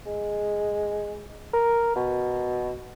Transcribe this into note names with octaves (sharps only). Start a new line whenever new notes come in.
G#3
A#4
B2